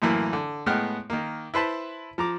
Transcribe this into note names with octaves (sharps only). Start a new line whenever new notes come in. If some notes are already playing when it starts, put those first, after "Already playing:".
F#2 A2 E3 A#3 E4
D3
A2 G#3 B3 F#5 G5 F6
D#3 A#3
E4 B4 C5 A5
F3 A#5 D6